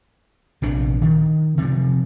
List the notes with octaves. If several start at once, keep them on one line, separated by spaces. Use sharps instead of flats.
A#1 C3 D4
D#3
C3 F3